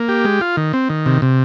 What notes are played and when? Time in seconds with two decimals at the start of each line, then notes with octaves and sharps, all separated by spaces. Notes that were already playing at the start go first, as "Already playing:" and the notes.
Already playing: A#3
0.09 G4
0.24 G#3
0.41 F4
0.57 D#3
0.73 C4
0.89 D#3
1.06 C3
1.22 C3